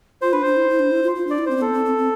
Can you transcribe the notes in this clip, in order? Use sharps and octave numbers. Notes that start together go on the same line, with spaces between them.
F4 C5
D4 B4
D4 C5
E4
E4
D4
E4
F4
F4
D4 D5
E4
C4 C5
C4
B3 A4
C4
C4
C4